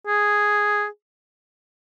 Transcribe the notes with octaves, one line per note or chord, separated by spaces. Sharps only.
G#4